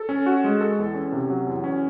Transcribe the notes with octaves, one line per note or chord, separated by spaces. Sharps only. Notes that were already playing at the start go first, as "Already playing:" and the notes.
Already playing: A4
C#4
F#4
G#3
A4
E2
C#4
C3
F#3
E2
C#4